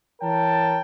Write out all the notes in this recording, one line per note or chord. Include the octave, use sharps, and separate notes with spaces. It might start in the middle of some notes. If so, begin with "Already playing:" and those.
E3 A#4 C#5 G5 A5